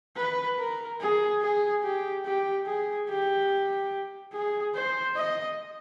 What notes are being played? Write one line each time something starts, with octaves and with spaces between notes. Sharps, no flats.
B4
A#4
G#4
G#4
G4
G4
G#4
G4
G#4
C5
D#5